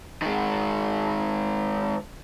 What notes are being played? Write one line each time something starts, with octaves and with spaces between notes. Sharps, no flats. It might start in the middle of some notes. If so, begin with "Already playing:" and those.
D#3 G#3